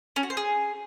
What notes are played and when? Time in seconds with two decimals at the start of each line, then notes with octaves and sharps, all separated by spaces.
0.16 C#4
0.23 F#4
0.30 C5
0.37 G#4